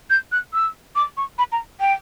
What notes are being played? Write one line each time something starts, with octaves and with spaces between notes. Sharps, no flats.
G6
F#6
E6
D6
C#6
B5
A#5
G5